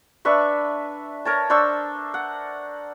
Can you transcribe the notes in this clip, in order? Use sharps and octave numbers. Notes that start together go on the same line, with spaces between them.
D4 B4 E5 C#6
A#4 C#5 A5
D4 C5 C#6 E6
F#5